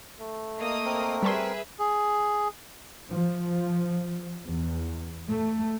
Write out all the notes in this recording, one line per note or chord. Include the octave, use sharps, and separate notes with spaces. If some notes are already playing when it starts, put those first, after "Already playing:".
A3
A#3 D#5 D#6
C4 A#4
G3 G#4 B4 E5 A5 C6
G#4
F3
E2
A3